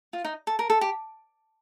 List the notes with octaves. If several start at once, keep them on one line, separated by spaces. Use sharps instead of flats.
F4
D#4
A4
A#4
A4
G4